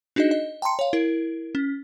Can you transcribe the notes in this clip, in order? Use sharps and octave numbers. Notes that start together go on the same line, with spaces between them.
D4 D#4 F#4 G#4 D#5
D#5
G5 A5 A#5 C6 C#7
C#5 F5
E4 A#4
C#4